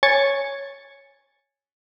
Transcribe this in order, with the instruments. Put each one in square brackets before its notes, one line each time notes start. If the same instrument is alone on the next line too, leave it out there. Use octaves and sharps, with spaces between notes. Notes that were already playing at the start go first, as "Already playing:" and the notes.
[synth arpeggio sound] C#5 G#5 G#6 A6 C#7